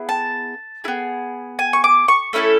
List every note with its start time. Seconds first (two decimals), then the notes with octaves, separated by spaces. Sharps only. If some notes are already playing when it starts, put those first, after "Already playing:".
Already playing: B3 E4 G#4
0.09 A5
0.84 E4 G#4
0.88 B3
1.59 G#5
1.73 C#6
1.84 D6
2.08 C#6
2.33 A3 C#4 E4 A4 B5